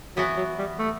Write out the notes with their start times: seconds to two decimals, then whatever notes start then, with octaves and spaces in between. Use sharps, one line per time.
0.16 E3 F#3 B3 F#4
0.37 F#3
0.59 G3
0.79 A3